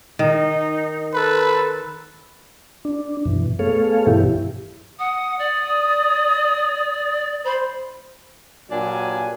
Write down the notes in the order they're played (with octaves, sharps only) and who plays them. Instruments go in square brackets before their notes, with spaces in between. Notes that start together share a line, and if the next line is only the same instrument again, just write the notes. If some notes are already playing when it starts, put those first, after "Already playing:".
[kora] D#3 [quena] D#4
[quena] A4 [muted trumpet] B4
[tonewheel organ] D4
F#2 B2 E3
A3 B3 G#4 A4 C#5 F5
G2 B2 E3 E4 G4
[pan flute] F#5 [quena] D#6
[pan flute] D5
[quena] C5 [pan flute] B5
[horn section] G2 A#2 F#3 D4 G#5